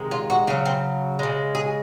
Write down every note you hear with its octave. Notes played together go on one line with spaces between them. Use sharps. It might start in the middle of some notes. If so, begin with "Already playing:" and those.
Already playing: C3 D#3 G#3
F4
F#4
C#3 F#3 F4
C4
C#3 G#3
G#4